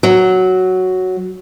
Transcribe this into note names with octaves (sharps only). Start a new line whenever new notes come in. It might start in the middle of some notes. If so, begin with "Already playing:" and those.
F#3